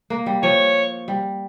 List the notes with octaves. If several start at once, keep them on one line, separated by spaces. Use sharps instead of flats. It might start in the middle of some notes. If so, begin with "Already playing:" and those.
A#3
G3
F3 C#5
G3